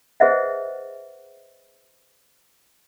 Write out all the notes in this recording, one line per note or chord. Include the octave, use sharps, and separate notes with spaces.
G#4 B4 C5 D#5 E5 F#5